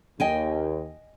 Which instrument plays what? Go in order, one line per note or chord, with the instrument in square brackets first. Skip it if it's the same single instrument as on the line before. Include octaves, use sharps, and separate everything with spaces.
[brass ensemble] D#2 [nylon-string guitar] D#5 G5 G#5